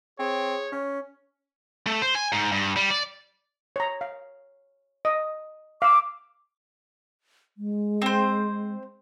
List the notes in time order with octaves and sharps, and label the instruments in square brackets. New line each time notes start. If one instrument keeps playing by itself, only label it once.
[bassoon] C4 [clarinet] G#4 [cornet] C#5
[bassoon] C#4
[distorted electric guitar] A3
C5
G#5
G#2
G2
G3
D5
[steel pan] C#5 A#5
F5
D#5
[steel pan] F5 E6 [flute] D6
[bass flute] G#3
[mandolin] C4 C5